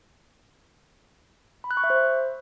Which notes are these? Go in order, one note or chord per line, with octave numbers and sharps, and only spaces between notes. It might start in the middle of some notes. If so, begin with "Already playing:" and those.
B5
F#6
C#6
E5
C5